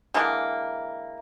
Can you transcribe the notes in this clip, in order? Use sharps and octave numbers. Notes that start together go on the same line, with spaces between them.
D3 E3 G#3 A#3